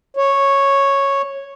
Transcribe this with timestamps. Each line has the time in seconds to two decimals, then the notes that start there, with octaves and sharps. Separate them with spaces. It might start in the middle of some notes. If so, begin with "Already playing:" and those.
0.17 C#5